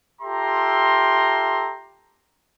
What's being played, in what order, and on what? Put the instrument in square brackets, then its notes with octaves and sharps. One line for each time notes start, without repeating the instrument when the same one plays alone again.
[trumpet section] F4 G4 A4 E5 A#5 C6